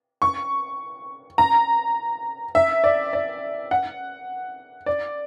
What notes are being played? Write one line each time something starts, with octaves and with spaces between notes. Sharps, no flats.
C#6
A#5
E5
D5
D5
F#5
D5